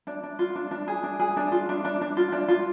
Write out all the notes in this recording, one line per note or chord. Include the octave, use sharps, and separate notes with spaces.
D4
D4
F4
D4
D4
G#4
D4
G#4
D4
F4
D4
D4
D4
F4
D4
F4